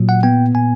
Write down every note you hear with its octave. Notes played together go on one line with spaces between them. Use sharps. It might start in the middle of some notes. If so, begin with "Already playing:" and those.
Already playing: A#2 F#3
F#5
B3 G5
A#2 G#5